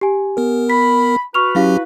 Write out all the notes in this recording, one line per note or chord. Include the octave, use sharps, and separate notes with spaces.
G4 G#5
B3 A#4
B5 B6
F#4 B4 C#6 F6 F7
F#3 C#4 E4 G4 F5